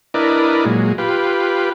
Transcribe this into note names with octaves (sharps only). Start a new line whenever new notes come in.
D4 E4 A#4 B4 D5 D#5
A#2 F#3 G#3
F4 G4 B4